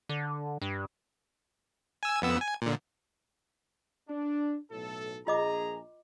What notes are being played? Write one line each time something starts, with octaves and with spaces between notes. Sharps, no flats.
D3
G2
G#5 E6
F2 B3 E6
G#5
A#2 D3
D4
B1 A2 A4
A#1 F4 G#4 D#5 A#5 D6